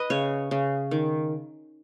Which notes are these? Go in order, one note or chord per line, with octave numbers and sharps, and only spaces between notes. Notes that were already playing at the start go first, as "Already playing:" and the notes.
Already playing: B4 D#5
C#3 C#5
C#3
D#3